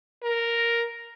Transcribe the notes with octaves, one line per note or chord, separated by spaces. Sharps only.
A#4